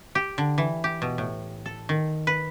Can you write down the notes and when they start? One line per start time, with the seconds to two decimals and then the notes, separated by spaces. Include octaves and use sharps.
0.15 G4
0.38 D3
0.58 E3
0.84 G4
1.02 B2
1.18 A2
1.66 A4
1.89 D#3
2.27 B4